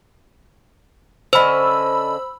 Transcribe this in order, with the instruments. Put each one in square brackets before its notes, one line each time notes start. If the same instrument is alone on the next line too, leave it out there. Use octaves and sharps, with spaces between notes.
[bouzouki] D3 C#4 D#5 [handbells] C5 [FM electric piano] B5 E6